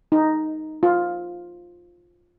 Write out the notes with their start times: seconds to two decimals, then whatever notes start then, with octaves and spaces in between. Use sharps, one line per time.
0.12 D#4
0.83 F4